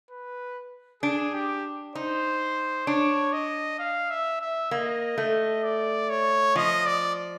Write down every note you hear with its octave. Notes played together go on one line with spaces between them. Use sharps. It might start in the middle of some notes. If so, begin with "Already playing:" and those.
B4
D4 G#4
G4
D#4 C5
D4 C#5
D#5
F5
E5
E5
A#3 D#5
A3
D5
C#5
F3 D#5
D5